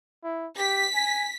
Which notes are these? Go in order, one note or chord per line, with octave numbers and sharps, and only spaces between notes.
E4
G4 B6
G#5